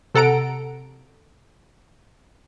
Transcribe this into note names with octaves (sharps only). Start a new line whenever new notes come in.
C3 A4 F#5 A#5 D7